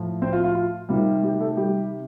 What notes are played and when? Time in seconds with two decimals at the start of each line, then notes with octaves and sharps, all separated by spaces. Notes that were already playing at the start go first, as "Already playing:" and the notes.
Already playing: A2 F3
0.22 C4 C5
0.32 F4
0.44 F4
0.55 F4
0.89 C3 D#3 G3 F4
1.23 G3 G4
1.40 A3 A4
1.57 G3 G4